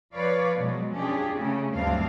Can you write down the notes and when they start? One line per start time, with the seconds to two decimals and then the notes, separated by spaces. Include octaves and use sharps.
0.15 F3 B4 C#5 D5 F5
0.57 B2 F3 F#3 G#3
0.94 C#4 D4 F4 G4 G#4
1.33 C#3 A3 C#4
1.73 D2 G2 F#3 C4 D4 F5